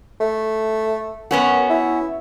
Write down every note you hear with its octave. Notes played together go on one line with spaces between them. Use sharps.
A3
F#2 B3 C#4 F#4
E4